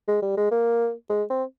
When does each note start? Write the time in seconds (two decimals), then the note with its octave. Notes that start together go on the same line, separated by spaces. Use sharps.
0.08 G#3
0.22 G3
0.37 G#3
0.51 A#3
1.10 G#3
1.30 C4